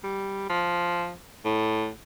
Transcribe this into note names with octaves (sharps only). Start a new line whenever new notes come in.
G3
F3
A2